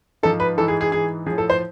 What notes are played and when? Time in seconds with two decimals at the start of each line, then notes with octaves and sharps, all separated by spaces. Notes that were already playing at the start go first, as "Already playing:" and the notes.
0.23 G#2 F3 A4
0.40 B4
0.57 G#2 E3 A4
0.68 G#4
0.81 G#4
0.91 G#2 E3 G#4
1.26 A2 F3 G#4
1.38 A4
1.50 C5